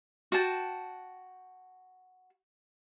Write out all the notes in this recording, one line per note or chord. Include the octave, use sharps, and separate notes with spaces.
F#4 G5 A5